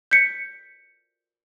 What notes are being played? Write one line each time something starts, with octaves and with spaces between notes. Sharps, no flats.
G6 B6 C#7